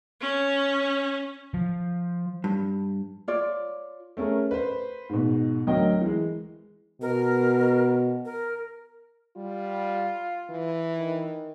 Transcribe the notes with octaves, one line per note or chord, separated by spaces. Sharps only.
C#4
F3
G2
F4 C#5 D5
A3 C#4 G#4 A#4
B4 C5
G#2 B2
D2 F#3 A#4 D#5 G5
E3 G#3
B2 A#4
A#4
G3 F4
E3
D#3